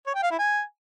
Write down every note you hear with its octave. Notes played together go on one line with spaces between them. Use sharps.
C#5
G5
F5
E4
G#5